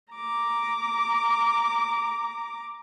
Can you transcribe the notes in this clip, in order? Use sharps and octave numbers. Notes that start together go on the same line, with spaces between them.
A#5 D6